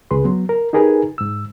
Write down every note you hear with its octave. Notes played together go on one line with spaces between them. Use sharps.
C#2 G#4 B4 C6
F#3 B3
A#4
D#4 G4 G#4 A#4 B4 G#5
G#2 E6